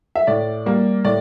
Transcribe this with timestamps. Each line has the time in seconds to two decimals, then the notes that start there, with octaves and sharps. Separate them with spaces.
0.15 E5
0.27 A2 D5
0.66 G3 A#3
1.05 A2 D5